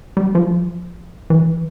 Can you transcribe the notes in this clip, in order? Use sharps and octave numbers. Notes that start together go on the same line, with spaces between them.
G3
F3
E3